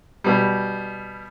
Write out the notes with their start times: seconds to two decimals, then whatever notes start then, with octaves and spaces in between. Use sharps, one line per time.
0.24 B2 G3